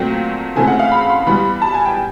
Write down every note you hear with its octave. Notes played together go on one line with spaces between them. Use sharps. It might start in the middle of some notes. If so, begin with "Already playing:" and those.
Already playing: A#2 F#3 A3 C4 G5
C#3 E3 A3 C4 G#5
F#5
F5
B5
C6
E3 G3 B3 B5
A5
G#5
G5